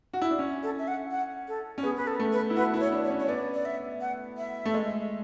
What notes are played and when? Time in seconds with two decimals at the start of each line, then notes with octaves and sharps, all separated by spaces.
0.13 F#4
0.22 E4
0.31 D4
0.39 C#4
0.63 A4
0.78 E5
0.87 F#5
1.11 F#5
1.48 A4
1.78 C#4
1.83 B3 G#4
1.97 B4
2.07 A4
2.19 A3
2.33 B4
2.50 E4
2.56 F#4 B4
2.74 E4 B4
2.80 C#5
2.92 D4
3.05 C#5
3.10 C#4
3.19 C#5
3.28 B3 D5
3.54 D5
3.65 E5
4.01 F#5
4.37 E5
4.66 A3
4.74 G#3